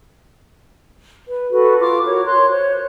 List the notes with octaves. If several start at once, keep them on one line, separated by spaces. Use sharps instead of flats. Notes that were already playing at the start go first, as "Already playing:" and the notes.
B4
F#4 A4 B4
F4 D6 F6
F#4 A#4 C#5
C#5 C6 F#6
C5 C#5